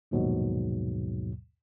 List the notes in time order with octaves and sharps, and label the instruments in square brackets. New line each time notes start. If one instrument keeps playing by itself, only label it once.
[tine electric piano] A#1 D#2 G#2 B2 F#3